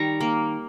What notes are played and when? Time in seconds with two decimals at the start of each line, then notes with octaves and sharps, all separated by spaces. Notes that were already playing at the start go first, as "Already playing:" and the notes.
Already playing: D#3 G3 A#5 C#6
0.21 A#3